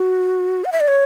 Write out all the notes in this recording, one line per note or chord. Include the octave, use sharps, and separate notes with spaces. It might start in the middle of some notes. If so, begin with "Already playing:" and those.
Already playing: F#4
F#5
E5
D5
C#5